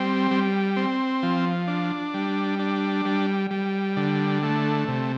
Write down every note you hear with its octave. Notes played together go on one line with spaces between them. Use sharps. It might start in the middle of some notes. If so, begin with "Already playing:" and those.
Already playing: G3 C4
G3
C4
F3
D4
G3
D4
G3
G3
D3
A3
C3